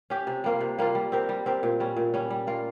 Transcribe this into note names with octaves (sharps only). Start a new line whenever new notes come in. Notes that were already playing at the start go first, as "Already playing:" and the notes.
C#4 G4
C3
G3 A#3 F4
C3
G3 A#3 F4
G3
C4 G4 A#4
G3
C4 G4 A#4
A#2
G3 C#4
A#2
G3 C#4
G3
A#3 F4 A#4